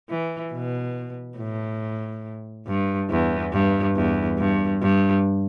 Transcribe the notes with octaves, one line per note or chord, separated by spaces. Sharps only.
E3
B2
A2
G2
E2
G2
E2
G2
G2